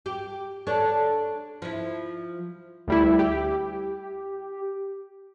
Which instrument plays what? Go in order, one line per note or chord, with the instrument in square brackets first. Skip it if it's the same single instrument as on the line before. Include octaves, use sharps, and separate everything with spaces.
[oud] G4
D4 A4 C#5
F3 E4
[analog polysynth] D2 G3 E4
G4